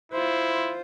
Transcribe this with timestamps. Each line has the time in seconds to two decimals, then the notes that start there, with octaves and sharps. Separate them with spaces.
0.12 E4 F4 C5